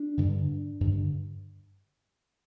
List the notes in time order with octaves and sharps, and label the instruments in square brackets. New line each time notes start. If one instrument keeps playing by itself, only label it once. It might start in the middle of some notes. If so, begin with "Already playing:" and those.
Already playing: [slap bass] D4
G2 D3
G2 D3